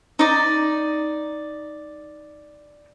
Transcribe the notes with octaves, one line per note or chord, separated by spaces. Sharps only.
D#4 D5